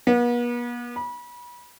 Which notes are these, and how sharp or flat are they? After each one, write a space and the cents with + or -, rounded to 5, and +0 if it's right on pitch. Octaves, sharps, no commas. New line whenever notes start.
B3 -40
B5 -30